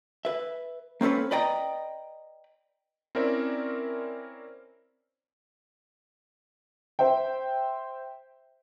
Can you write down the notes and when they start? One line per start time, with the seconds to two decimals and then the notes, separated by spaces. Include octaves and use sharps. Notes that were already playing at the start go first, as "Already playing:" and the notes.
0.25 B4 E5
1.01 A#3 C4 C#4 A4 B4
1.31 B4 D5 D#5 G5 A#5
3.15 C4 C#4 E4 A#4 D5 E5
6.99 C5 E5 G5